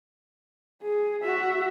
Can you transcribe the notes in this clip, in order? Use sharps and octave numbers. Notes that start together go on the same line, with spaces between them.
G#4
F#4 E5